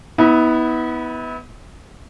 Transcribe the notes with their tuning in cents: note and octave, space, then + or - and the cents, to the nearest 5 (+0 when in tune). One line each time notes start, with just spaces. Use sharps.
B3 +0 E4 -40